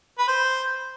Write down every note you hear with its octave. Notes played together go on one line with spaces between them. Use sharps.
B4
C5